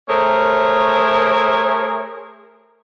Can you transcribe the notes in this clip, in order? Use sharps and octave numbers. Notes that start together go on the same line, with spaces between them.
A3 G#4 A#4 C5 C#5